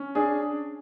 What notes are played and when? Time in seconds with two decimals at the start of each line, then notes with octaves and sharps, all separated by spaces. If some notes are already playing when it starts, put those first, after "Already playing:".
Already playing: C#4
0.15 D4 G#4